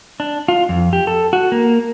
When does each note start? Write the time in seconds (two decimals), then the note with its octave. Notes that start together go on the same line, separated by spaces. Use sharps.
0.20 D4
0.48 F4
0.69 F2
0.93 G4
1.07 A4
1.33 F#4
1.52 A#3